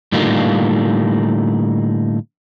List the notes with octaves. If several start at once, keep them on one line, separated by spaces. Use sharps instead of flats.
A2 D3 G3 A#3 D#4 F4